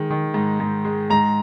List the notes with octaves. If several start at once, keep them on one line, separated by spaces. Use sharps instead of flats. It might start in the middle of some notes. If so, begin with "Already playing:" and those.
Already playing: D#3 G#3
D#3
G#2
G#2
G#3
G#2 A#5